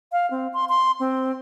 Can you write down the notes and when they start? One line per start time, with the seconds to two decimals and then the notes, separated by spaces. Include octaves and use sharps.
0.12 F5
0.31 C4
0.54 C6
0.69 C6
1.00 C4